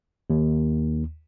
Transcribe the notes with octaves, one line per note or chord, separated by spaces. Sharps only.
D#2